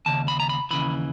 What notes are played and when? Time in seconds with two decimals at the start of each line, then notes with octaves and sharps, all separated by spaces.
0.06 D#2 C#3 A5
0.28 B5
0.40 A#5
0.49 B5
0.71 D#2 C#3 E3 B5